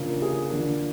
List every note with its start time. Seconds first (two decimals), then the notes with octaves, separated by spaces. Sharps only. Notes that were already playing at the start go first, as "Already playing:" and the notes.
Already playing: C#3 F3 A#3 D4
0.22 G#4
0.50 D3 F3 A#3 D4